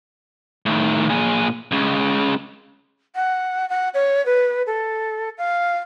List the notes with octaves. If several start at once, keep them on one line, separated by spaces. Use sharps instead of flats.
A2 D#3
A#2 G#4
C#2 C#3
F#5
F#5
C#5
B4
A4
F5